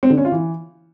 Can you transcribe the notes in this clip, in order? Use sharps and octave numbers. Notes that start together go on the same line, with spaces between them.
C4
D3
C#4
F4
E3